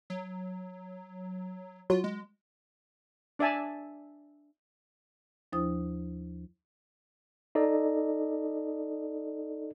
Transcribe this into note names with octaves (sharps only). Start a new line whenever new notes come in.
F#3
F#3 F4
G#3
D4 D5 E5 G#5 A5
D#2 F3 D4 E4 C5 D#6
D#4 A4 D5 D#5